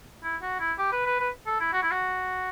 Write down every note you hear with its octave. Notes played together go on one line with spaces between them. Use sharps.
E4
F#4
E4
G4
B4
B4
B4
A4
E4
F#4
E4
F#4